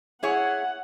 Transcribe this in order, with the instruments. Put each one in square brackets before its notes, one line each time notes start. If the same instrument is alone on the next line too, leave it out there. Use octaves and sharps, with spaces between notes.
[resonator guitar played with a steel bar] E4 G#4 C#5 [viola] F#5